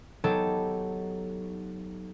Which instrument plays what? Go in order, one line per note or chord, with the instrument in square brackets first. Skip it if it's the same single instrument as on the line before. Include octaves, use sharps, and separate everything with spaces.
[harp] F#3 B3 D#4 G4 A4